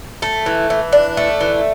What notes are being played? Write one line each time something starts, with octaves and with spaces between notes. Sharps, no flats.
A3
E3
E3
D4
A3
E3